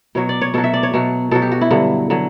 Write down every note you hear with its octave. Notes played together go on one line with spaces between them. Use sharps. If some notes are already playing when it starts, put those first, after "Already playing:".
B2 F#3 C#5
D5
C#5
B2 F#3 A4
E5
D5
C#5
B2 F#3
B2 F#3 A4
G4
F#4
E4
G2 D3 F#3
D3 F#3